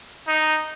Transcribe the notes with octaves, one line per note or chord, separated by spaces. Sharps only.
D#4